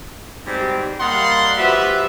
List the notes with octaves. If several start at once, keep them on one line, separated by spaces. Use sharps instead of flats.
G#2 B2 G3 C4 G4
G3 A#3 D#5 F5 F#5 C6
F3 F#4 G4 B4 E5